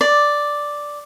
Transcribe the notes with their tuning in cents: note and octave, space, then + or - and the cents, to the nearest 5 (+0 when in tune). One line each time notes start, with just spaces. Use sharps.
D5 +0